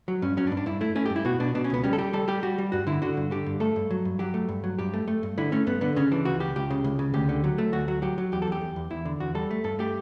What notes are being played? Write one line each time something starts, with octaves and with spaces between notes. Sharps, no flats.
F#3
G2 C#4
F#3 C#4
D4
G2
D4
G2 E4
A3 E4
A3 C#4
G4
G2
E4
B2 F#4
B2 D4
B2 D4
C#4
C#2 B3
G3 C#4
A4
G3 G4
G3 A4
G3 G4
G3 F#4
G3
G2 F#4
D3 E4
D3 F#4
G2
D3 G4
G2
A3 A4
G2
F#3
G2
F#3 G4
A3
G2
F#3
G2 G4
A3
A3
G2
D3 E4
A3 C#4
G2 B3
D3 B3
C#3 C#4
E3 D4
C#2 F#4
C#2 G4
C#2 G4
C#3
C#2
C#3
D2 G4
D3
F#3
A3
D2 F#4
F#3 F#4
F#3 G4
F#3
E2 G4
A4
E2 G4
E2
E2
E2 E4
D3
E2 F#4
G3 A4
A3
G2 A4
A3 G4